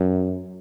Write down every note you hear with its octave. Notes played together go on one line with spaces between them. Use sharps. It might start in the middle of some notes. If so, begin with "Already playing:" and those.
Already playing: F#2